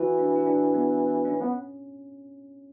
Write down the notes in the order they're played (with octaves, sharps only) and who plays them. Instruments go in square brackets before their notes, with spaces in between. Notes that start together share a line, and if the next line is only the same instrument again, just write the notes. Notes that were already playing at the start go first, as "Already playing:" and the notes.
Already playing: [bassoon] E3 [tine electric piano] E4 F#4
[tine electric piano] D4
E4
D4
B3
D4
C#4
[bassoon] B3